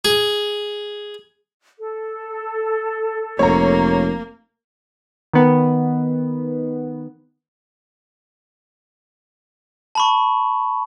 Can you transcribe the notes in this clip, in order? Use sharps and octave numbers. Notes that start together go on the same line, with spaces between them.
G#4
A4
F1 A#3 C#5 A#5
D#3 B3
A5 B5 C#6